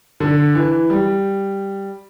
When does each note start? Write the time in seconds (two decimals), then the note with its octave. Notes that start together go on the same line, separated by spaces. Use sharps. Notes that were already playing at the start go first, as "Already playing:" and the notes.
0.20 D3
0.55 E3
0.90 G3